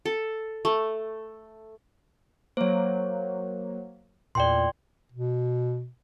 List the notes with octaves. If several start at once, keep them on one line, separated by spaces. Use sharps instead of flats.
A4
A3
F#3 A#3 C5 C#5
E2 A#2 D5 G5 C6
B2